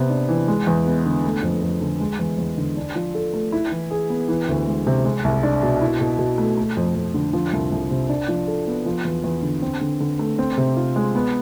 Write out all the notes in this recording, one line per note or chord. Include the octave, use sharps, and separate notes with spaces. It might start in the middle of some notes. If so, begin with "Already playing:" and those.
Already playing: C3 B3
D4
E3
G#3
E2
B3
D3
A3
F2
F2
D3
G#3
E2
E2
D3
D4
F3
A4
A3
E4
E3
G#4
B3
E3
D2
G#3
C3
G#3
C2
D4
B2
E4
B2
B2
A3
A3
F2
F2
D3
F3
C2
C2
C3
D4
F3
A4
B3
F3
E2
E2
D3
C4
D3
D3
A3
C4
C3
F4
G#3
B3